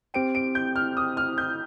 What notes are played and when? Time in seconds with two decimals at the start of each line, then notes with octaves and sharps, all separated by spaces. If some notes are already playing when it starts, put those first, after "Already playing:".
0.14 C4 G4 C5 G5 D7
0.35 D7
0.55 G6
0.76 F6
0.97 D#6
1.17 F6
1.38 G6